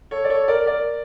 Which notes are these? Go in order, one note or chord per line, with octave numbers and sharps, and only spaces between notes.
A4 C#5
D5
A4 C#5
A#4 D5
A#4 D5